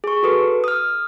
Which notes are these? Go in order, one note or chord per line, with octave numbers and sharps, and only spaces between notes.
G#4 C#6
F#4 A4 B4
D#6 F6